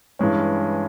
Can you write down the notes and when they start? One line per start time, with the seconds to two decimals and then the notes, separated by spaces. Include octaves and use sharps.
0.19 G2 E3 G#3 C#4